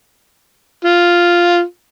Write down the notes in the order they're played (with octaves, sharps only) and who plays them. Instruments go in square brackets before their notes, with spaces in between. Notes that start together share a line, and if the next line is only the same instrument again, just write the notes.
[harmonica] F4